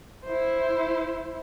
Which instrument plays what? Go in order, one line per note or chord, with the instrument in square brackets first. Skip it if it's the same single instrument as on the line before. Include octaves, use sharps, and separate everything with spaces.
[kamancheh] E4 C5